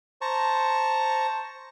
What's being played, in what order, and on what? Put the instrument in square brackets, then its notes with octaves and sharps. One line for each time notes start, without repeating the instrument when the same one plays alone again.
[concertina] C5 A5 A#5 C#6